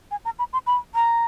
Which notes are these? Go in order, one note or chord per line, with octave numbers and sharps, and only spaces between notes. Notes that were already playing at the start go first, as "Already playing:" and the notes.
G#5
A#5
B5
C6
B5
A#5